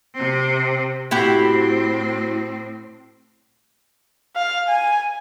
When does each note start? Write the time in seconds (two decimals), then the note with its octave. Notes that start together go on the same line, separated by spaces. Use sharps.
0.15 C3 C4
1.11 A2 C4 E4 F#4 G4
4.36 F5
4.68 G#5